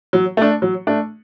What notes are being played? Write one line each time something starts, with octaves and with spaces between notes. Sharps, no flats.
F#3
A3 D4
F#3
A3 D4